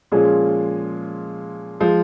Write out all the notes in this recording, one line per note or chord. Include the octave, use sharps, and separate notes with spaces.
A#2 F3 G#3 C#4 G#4
F3 G#3